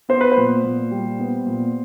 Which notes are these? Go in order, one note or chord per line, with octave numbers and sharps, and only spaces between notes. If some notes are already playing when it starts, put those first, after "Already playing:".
B3 C5
B4
C5
A#2
A#2
G3
B3
A#2